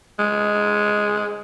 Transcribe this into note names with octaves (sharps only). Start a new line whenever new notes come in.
G#3